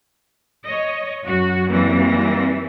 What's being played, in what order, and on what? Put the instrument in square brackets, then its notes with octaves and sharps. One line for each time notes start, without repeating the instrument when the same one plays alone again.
[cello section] C#5 D#5
[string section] F#2 [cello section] F#4
[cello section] E3 G3 [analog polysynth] A#3 C4 A#6